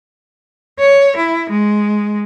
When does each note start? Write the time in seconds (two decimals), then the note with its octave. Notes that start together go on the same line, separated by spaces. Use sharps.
0.80 C#5
1.17 E4
1.50 G#3